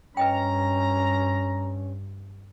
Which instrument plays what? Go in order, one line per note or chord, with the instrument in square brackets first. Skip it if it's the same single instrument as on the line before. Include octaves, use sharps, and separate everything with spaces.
[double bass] G2 [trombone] C#4 [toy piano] B4 D#5 G5 [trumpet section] A#5